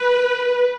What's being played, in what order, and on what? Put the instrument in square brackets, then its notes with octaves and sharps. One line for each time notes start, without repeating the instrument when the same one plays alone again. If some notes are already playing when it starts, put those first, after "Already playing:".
Already playing: [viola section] B4